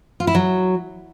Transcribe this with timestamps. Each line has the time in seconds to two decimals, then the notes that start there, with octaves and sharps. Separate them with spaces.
0.20 F4
0.27 E4
0.35 F#3